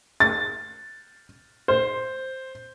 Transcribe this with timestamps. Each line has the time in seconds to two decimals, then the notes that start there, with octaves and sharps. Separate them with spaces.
0.20 A6
1.68 C5